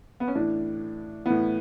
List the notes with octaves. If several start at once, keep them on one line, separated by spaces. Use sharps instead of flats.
B3
C#4
A2 E3 D4
A2 E3 B3